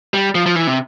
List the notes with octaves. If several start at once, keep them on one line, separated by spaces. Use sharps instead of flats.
G3
F3
F3
E3
C3